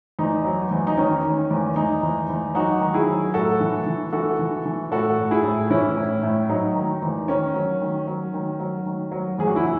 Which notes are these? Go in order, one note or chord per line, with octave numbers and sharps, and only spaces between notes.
E2 D#4
F#3
E2
D#4
D#3 C#4
D#3
E2
E2 D#4
E2
E2
F#3 D#4 F#4
D#3
E4 G#4
F#3
A2 F#4 A4
E3
E3
E3 F#4 A4
E3
E3
A2 F#4 A4
A2
E4 G#4
A2
E3 C#4 E4
A2
A2
F#3 D#4
D#3
E2
D#3 C#4
F#3
D#3
F#3
D#3
F#3
D#3
F#3
E2 G#4
F#4
E4
E3